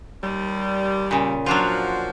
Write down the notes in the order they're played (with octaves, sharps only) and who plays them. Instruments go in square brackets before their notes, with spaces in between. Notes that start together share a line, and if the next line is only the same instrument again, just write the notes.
[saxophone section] D#2 G3
[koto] A#2 C#3
[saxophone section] F3 F#4 [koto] F#3 D4 F4